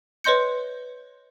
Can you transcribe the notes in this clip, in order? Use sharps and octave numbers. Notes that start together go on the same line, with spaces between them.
B4 C#5 D#5 C6 G6 C#7